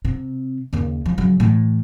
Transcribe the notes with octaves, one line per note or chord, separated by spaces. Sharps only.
C3
D#2 C#3
F3
C#3 F#3
A2 E3